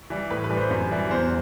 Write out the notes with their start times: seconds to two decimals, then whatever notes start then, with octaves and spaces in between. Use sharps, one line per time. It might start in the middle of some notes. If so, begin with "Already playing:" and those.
0.10 E3 G3
0.31 A2 B4
0.44 B4
0.50 E3 G3
0.57 C5
0.71 F#2
0.91 E3 G3
1.11 E2 C5